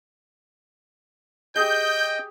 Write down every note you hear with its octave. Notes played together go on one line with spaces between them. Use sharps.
G4 G#4 D#5 G5 G6